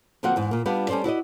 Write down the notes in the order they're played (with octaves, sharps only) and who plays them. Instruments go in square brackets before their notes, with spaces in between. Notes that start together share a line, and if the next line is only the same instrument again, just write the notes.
[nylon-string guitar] D3 F3 A#3 C4 F#4 F#5
E2 G#2
A#2 A#3
G3 B3 D4 F4
G3 C#4 A4 C5 D5
E4 F#4 D5 D#5